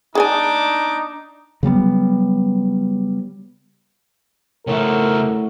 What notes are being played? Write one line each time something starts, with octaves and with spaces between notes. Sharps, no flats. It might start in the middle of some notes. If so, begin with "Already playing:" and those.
D4 D#4 G#4 G5 G#5 D6
C#3 F#3 G3 B3
A2 C#3 E4 A#4 F#5 C#6